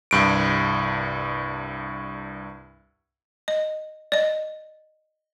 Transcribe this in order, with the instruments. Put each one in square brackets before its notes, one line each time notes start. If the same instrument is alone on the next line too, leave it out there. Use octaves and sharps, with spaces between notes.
[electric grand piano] C2 G2 D7
[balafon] D#5
D5 D#5